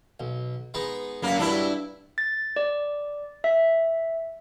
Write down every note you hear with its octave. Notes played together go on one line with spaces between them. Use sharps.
B1
G#3 B3 D#4
F#2 A#3
G2 F#3 G3 D4 E4
A6
D5
E5